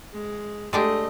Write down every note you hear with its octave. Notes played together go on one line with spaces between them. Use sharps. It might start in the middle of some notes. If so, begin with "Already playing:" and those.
G#3
G#3 A3 D4 G4 D#5